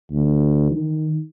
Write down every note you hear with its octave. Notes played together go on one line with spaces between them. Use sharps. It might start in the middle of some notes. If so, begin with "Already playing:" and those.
D2
D#3